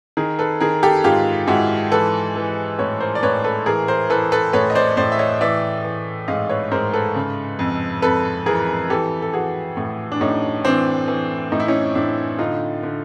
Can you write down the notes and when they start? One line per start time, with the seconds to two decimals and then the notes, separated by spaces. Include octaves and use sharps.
0.17 D#3 G#4 A#4
0.39 A4 B4
0.61 D#3 G#4 A#4
0.83 G4 A4
1.04 G#2 F4 G4
1.47 G#2 E4 F#4
1.92 E3 A4 B4
2.36 E3
2.79 A2 B4 C#5
3.00 A#4 C5
3.15 D5
3.23 A2 B4 C#5
3.44 A4 B4
3.66 E3 G#4 A#4
3.88 A#4 C5
4.10 E3 A4 B4
4.32 A4 B4
4.53 A2 B4 C#5
4.70 D#5
4.75 C5 D5
4.97 A2 C5 D5
5.12 E5
5.19 C#5 D#5
5.41 E3 D5 E5
5.84 E3
6.28 G#2 D#5 F5
6.49 B4 C#5
6.71 G#2 A#4 C5
6.93 A4 B4
7.16 C#3
7.59 F2
8.02 F2 A4 B4
8.46 E3 G#4 A#4
8.90 E3 G4 A4
9.22 A4
9.33 E3 F#4 G#4
9.77 A2
10.12 D4
10.21 A2 C#4 D#4
10.65 E3 C4 D4
11.08 E3
11.52 A2 D#4
11.60 E4
11.68 C#4 D#4
11.95 A2 D4 E4
12.38 D3 D#4 F4
12.83 D3